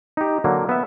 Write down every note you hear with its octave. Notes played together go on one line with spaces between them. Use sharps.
D#4 G4
D3 F#3 A#3
B3 E5